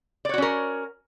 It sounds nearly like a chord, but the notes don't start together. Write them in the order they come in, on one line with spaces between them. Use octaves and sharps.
D5 C#5 F#4 C#4 A#4